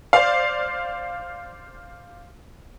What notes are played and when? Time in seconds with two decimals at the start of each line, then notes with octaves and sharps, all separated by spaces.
0.13 C5 D5 F5